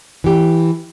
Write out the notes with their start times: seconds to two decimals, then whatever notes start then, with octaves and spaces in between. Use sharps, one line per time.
0.24 E3 G4